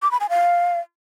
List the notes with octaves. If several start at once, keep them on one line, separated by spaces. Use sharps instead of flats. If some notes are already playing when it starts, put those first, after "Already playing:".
D6
B5
G#5
F5